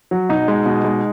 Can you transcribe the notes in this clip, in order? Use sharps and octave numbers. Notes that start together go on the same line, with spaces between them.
F#3
B2 D#4
G#3
B2
G#3